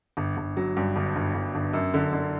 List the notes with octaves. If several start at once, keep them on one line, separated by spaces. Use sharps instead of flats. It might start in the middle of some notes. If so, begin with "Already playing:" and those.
G1
G1
F#3
G2
G1
G1
G1
G1
F#2
D3
D3